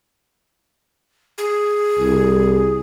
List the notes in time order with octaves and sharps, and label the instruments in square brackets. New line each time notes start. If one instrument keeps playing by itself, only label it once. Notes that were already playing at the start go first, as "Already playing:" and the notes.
[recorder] G#4
[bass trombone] C2